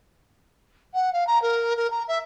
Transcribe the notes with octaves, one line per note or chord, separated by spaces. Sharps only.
F#5
F5
A#5
A#4
A#4
A#5
E5